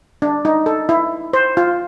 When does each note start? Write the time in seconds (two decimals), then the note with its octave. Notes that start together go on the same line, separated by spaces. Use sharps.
0.22 D4
0.45 D#4
0.66 A4
0.89 E4
1.33 C5
1.57 F4